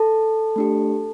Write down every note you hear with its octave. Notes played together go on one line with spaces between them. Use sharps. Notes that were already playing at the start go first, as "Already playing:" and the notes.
Already playing: A4 A5
A3 D4 G4